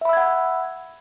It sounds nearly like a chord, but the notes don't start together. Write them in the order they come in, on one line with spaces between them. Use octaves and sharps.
E5 B5 E6 G#6 F#5